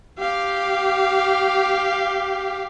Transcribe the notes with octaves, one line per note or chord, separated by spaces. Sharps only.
G4 F5